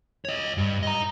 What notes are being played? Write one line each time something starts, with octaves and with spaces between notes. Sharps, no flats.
C#5 D#5
G2
D#5 A#5